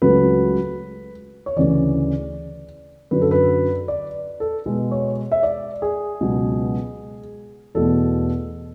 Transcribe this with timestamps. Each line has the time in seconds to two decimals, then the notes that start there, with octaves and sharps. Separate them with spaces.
0.02 C#2 C#3 F#3 A3 B4
1.46 C#5
1.56 D2 C#3 E3 D5
3.11 F#2 D3 F#3 B4
3.21 A4
3.31 B4
3.88 D5
4.40 A4
4.66 B2 G#3 B3
4.91 C#5
5.32 E5
5.43 D5
5.82 G#4
6.21 C#2 B2 F#3 B3
7.75 E2 B2 A3 A4